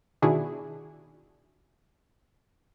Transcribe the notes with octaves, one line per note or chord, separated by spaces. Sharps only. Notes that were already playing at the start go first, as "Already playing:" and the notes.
B2 D#3 D4 E4 F#4 G#4